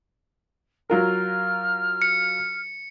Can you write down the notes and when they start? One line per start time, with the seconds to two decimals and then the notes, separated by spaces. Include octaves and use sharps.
0.90 F#3 F4 A#4 F6
2.02 C#7